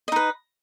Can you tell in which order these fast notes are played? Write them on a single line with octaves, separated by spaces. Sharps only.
D#5 D#4 B4